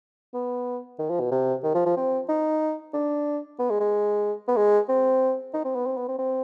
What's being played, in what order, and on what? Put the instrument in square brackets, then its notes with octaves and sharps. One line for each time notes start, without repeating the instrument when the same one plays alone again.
[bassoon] B3
D#3
F3
B2
C3
D#3
F3
F3
C4
D#4
D4
B3
G#3
G#3
B3
G#3
C4
D#4
C4
B3
C4
B3
C4
C4